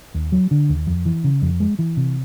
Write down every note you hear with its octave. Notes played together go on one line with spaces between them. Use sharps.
D#2
F#3
D3
D#2
F2
E3
C#3
F2
G#3
E3
C3